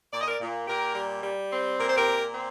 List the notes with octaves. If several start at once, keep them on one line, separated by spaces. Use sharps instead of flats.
A#2 D5
D#5
A#4 D5
A#2
A#2 G4 A#4
G3
G3
C4
A#2 A#4
C5
G4 A#4
A#2
C4